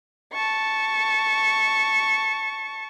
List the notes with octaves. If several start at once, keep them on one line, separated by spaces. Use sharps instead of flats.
A5 C#6